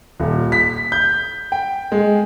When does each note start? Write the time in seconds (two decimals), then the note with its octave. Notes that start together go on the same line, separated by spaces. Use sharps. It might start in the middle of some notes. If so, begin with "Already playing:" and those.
0.20 D#1
0.52 B6
0.92 G6
1.52 G5
1.92 G#3